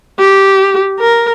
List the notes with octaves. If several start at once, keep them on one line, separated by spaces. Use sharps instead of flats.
G4
A#4